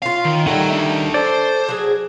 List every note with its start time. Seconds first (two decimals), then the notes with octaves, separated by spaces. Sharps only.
0.02 C#4 F4 F5
0.25 D#3
0.47 D#3 G3 A3 F#5 A#5
0.70 D4 E5
1.14 A4 C5 D5
1.69 F#3 G#4